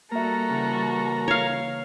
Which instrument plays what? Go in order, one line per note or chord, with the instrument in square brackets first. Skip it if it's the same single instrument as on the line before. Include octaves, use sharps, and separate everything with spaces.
[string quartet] G3 F#4 A4 [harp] A#3 E5 [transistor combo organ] A#4 A#5
[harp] C#3 E3
[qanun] C#5 F5